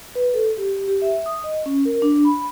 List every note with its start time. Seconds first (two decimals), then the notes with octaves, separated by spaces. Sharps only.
0.15 B4
0.34 A4
0.58 G4
0.88 G4
1.02 E5
1.26 D#6
1.44 D#5
1.66 C#4
1.85 A#4
2.02 D4
2.25 B5